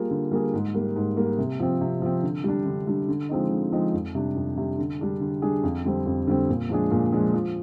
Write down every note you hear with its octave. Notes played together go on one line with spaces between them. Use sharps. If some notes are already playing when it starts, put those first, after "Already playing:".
Already playing: G3 A#3 F4 G#4
D3
G3 A#3 F4 G#4
G#2
G3 A#3
G#2
G3 A#3
C3
F3 C4
C3
F3 C4
D3
G3 D4
D3
G3 D4
D3
F3 G#3 C4 D#4
D3
F3 G#3 C4 D#4
F2
C3 G3 D4
F2
C3 G3 D4
D3
G3 D4 G#4
D3
G3 D4 G#4
F2
D3 G3 C4
F2
D3 G3 C4
A#2
F3 G#3 D4 G#4
A#2
F3 G#3 D4 G#4
F3